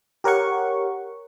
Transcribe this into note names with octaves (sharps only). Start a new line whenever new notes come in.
G4 A#4 C#5 F#5 C#6